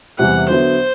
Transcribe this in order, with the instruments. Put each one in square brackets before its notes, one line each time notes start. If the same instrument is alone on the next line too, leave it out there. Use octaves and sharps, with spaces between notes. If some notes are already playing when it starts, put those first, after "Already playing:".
[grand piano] E2 C3 E3 G3 [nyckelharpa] F#5
[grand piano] D3 F#3 B3 E4 [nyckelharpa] C5